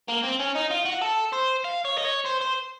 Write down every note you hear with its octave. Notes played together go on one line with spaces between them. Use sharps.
A#3
C4
C#4
D#4
F4
F#4
A4
C5
F5
C#5
D#5
C#5
C5
C5